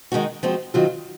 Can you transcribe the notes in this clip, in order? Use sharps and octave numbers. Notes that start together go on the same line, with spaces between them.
D#3 G#3 D#4 F#4
F3 G#3 C4 F#4
D#3 F#3 C4 F4